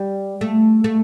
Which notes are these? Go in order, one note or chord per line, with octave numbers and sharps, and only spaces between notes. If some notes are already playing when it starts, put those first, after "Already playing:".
Already playing: G3
A3
A3